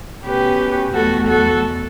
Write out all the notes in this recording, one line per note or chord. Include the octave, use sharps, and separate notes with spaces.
B2 A3 C#4 G4 B4
E2 B2 A3 F#4 A4
F#4 A4